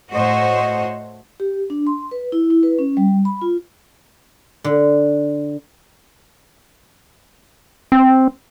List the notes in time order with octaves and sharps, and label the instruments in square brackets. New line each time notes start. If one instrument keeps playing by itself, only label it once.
[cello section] A2 A3 F#4 C5 C#5 D#5
[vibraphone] G4
D4
C6
B4
E4
E4
B4
C#4
G3
B5
F4
[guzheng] D3
[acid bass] C4